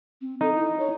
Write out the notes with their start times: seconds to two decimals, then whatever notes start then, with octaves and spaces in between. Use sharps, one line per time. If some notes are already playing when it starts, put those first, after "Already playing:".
0.21 C4
0.41 D#4 A4
0.55 E4
0.79 C#5